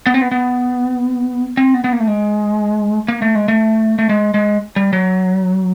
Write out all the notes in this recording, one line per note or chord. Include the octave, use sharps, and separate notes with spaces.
B3
C4
B3
B3
C4
B3
B3
A#3
A3
G#3
A#3
A3
G#3
A3
A3
G#3
G#3
G3
F#3